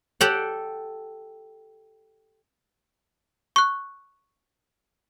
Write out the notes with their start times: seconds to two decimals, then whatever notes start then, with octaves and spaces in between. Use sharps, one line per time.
0.21 G4 A4 D5 F#5
3.56 C#6 F#6